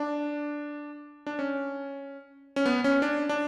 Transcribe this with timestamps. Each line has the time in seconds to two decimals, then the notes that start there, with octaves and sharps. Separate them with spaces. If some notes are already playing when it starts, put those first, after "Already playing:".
Already playing: D4
1.26 D4
1.39 C#4
2.56 C#4
2.66 B3
2.84 C#4
3.02 D4
3.29 D4